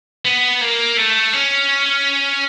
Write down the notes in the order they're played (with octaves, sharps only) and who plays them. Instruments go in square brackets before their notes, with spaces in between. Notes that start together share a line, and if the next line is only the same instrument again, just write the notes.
[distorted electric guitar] B3
A#3
A3
C#4